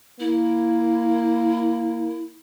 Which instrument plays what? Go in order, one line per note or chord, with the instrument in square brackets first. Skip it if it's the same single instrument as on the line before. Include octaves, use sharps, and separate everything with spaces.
[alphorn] A#3 [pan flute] E4